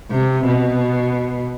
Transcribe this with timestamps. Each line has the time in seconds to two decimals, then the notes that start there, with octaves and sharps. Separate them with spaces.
0.10 C3
0.45 B2